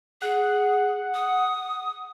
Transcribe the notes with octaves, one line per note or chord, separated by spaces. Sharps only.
G#4 F#5
D#6